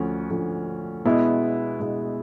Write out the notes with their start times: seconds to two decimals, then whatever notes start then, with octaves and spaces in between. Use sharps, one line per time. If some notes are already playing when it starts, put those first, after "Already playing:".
Already playing: D2 D3 F3 A3 C#4
0.30 D2 D3 F3 A3 C#4
1.05 B2 G#3 B3 E4
1.80 B2 G#3 B3 E4